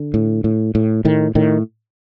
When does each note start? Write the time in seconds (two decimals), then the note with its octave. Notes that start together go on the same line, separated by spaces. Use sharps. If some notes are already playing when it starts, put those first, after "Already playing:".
Already playing: D3
0.14 A2
0.44 A2
0.75 A2
1.05 A2 D#3
1.35 A2 D#3